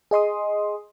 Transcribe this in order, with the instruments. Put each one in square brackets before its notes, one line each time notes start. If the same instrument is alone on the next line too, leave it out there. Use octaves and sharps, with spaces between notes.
[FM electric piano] G#4 D#5 C6 D#6